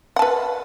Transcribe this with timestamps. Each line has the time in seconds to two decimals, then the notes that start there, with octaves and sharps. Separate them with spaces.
0.16 F#5
0.19 A5
0.22 B4